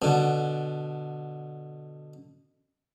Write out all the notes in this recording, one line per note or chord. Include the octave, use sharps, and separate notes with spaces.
B2 D3